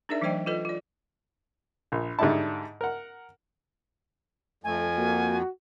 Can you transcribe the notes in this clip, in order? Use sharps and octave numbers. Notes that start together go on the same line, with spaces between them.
D4 D#4 G#4 A#4 D5 E5
E3 F#3 A3 C5 D#5 G5
F4 A4 B4 D#5
F4 D5
A#1
G#2 D3 G3 D#4 E4 A5
A#4 F#5
F2 A3 G#5
A#3 F#4